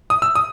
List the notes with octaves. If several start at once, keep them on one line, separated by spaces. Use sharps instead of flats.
D#6
E6
D#6